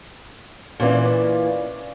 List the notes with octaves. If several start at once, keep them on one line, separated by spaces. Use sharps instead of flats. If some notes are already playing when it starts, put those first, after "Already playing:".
A#2 E3 C#4 F4 D5